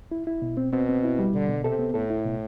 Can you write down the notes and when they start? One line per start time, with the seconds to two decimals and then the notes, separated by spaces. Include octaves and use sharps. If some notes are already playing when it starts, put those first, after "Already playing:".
0.11 E4
0.27 E4
0.42 B2
0.57 C4
0.72 B2 C4
0.89 C4
1.04 E4
1.19 G3
1.33 B2 D3
1.49 B2
1.64 C3 A4
1.79 B3
1.94 A2 A4
2.10 E4
2.25 B2